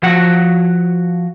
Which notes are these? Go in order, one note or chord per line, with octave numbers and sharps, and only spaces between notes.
F3 F#4 F#5